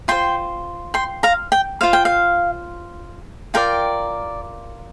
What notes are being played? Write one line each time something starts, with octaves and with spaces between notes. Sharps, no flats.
F4 C5 G5 C6
G5 C6
F5 A#5
G5
F4 C5 F5
G5
F5
F4 A#4 D5 G5